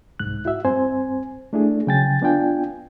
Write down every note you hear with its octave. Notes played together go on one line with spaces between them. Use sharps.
C2 G#2 F#6
E4 F#4 E5
G2 C4 C5 G#5
A3 D4 E4 G#4
C#3 F#3 G5 G#5 A6
B3 D4 F4 G5 G#5